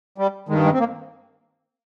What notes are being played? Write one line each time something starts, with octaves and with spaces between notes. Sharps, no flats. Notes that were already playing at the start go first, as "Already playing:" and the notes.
G3
G2 D#3 G#3
G#3
C4
A#3